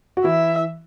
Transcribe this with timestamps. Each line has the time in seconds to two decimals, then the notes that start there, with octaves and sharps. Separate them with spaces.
0.17 F#4
0.24 E3 E4 E5